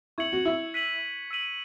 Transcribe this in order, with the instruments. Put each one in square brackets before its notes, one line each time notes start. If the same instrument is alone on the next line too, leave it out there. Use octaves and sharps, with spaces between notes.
[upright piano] E4 [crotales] C#6 G#6 C#7 F#7
[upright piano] F#4
E4
[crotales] F#6 B6 D#7 F#7
E6 B6 D#7 F#7